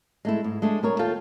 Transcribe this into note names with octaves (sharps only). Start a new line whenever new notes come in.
G#3 A3 E4
G#2
G#3 A3 D4 G#4
G3 A#4 C#5
D#2 F4 A4 G5